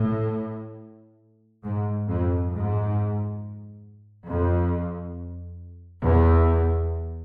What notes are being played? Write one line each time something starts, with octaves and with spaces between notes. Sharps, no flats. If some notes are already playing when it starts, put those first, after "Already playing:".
Already playing: A2
G#2
F2
G#2
F2
E2